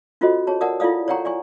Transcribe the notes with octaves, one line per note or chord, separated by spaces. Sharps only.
C#4 F4 F#4 A4 C5 D#5
G#4 C#5 A5
A#4 D5 F#5 A5 D#6
E4 F4 A4 D5 F5 D#6
C#5 D5 F#5 G5 A#5 C#6
D5 G#5 C#6